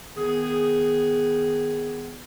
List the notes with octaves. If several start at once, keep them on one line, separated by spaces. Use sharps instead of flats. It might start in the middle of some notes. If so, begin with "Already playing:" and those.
D#3 B3 G#4